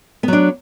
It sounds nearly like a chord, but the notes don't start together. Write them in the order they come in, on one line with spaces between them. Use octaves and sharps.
B3 F#3 D4